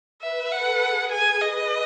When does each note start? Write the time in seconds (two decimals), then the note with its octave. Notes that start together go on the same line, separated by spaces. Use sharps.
0.21 B4 E5
0.52 A4 F#5
0.82 G#4
1.12 G#4 G#5
1.42 B4 D#5